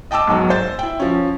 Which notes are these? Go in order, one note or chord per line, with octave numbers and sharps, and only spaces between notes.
D#5 G5 A5 D6 E6
B1 G#2 B2 F#3
C5 A6
E4 G5
F3 C#4